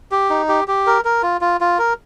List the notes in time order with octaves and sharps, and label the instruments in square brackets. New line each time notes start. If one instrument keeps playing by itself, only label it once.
[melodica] G4
D#4
G4
G4
A#4
A#4
F4
F4
F4
A#4